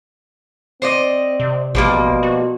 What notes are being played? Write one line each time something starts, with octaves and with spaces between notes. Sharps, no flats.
C4 C5 D5 D#5
C3
A1 B2 F3 G3 A#3
F#4